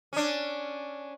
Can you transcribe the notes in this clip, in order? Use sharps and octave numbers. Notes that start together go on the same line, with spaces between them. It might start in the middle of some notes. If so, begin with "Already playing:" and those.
C#4 D4